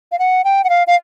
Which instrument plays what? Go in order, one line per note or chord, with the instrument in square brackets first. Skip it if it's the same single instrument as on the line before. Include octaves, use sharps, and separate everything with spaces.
[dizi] F5
F#5
G5
F#5
F5
F5